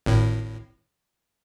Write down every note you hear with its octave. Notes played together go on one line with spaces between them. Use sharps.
G#1 A2